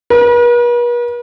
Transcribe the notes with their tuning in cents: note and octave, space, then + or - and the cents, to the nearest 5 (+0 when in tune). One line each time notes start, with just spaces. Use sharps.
B4 -45